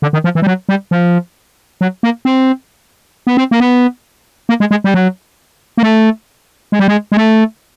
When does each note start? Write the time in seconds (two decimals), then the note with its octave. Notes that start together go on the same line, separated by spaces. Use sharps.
0.02 D3
0.13 D#3
0.24 F3
0.35 E3
0.42 G3
0.47 F#3
0.69 G3
0.91 F3
1.81 F#3
2.03 A#3
2.25 C4
3.27 B3
3.37 C4
3.51 A#3
3.60 B3
4.49 A#3
4.60 G#3
4.71 G#3
4.84 G3
4.94 F#3
5.78 A#3
5.83 A3
6.72 G#3
6.79 G3
6.88 G#3
7.12 G#3
7.17 A3